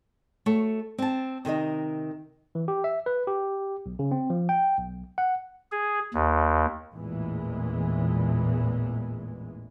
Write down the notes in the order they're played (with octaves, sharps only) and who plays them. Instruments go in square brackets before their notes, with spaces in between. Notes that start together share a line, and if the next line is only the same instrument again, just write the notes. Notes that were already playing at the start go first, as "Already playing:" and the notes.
[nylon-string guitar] A3 F#4 C#5
C4 A5
C3 D#3 A#4 D#5
[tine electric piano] E3
G4
E5
B4
G4
B1
C#3
C4
F3
G5
B1
F#5
[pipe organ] G#4
D#2
[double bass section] A1 E2 A#2 E3 G#3